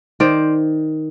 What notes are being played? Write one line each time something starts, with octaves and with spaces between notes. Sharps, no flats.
D#3 C5 D5